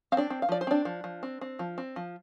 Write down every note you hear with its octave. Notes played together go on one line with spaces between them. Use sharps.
C4 F5
D4 D5
C4
F5
F3 D5
C5
C4 D4 D5
F3
F3
C4
C4
F3
C4
F3